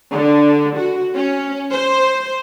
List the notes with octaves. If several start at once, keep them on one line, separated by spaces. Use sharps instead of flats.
D3
F#4
C#4
C5